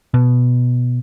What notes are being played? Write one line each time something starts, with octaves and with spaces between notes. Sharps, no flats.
B2